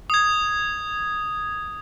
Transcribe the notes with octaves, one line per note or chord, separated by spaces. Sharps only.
D#6 G#6